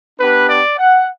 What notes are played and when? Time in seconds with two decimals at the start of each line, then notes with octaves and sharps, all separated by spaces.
0.20 B3 D4 G4 B4
0.49 D5
0.77 F#5